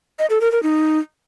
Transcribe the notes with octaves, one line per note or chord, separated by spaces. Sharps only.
D#5
A4
A#4
A#4
D#4